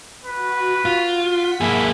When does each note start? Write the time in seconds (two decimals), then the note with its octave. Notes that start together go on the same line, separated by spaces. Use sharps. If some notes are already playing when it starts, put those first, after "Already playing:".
0.25 F#4 B4
0.85 F4
1.18 F#5 B6
1.61 A#3 E4 G#4